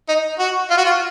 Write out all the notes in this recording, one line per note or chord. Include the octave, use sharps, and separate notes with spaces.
D#4
F#4
F4
F#4
F4